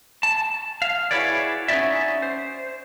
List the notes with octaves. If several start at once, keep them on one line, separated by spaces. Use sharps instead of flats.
A5
F5
E4 F#4 G#4 B4 C#5 D5
C#4 D#4 E4 F#4 D5 E5
C5